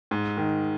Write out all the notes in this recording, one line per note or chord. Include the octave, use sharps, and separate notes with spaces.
G#2
D#3